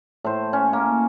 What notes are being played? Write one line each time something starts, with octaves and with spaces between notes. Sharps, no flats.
A2 C5
C#4
A#3